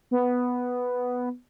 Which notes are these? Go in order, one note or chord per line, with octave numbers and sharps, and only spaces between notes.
B3